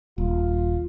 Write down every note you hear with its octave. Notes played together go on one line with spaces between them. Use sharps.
D#1 F4